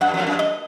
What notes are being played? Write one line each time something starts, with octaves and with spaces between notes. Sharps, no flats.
F#2 F#5
F2
F5
F#2
D#5